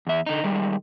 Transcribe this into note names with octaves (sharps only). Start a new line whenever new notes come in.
E2 E5
D3 D#4
D#3 G3 G#3